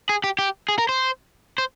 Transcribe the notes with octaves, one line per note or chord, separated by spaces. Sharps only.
G#4
G4
G4
G#4
A#4
C5
C5